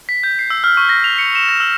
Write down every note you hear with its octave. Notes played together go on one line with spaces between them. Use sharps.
B6
G6
C7
E6
F6
C#6
A#6
F7
C#7
E7
A#6
E6